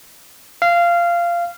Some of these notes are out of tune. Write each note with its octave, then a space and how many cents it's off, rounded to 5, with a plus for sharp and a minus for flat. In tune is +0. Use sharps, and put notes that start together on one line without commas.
F5 -15